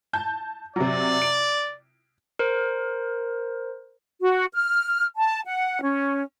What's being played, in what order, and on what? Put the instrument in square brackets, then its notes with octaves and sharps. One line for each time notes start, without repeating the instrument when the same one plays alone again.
[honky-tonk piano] A5 G6
[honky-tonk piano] C3 F#3 [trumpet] D5
[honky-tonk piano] D7
[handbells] A#4 C5
[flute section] F#4
F6
A5
F#5
C#4